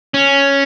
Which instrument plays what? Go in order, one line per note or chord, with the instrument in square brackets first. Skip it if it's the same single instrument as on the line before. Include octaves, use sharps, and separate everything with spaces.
[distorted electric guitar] C#4